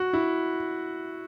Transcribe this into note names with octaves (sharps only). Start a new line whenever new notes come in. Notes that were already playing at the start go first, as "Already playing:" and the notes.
Already playing: F#4
E4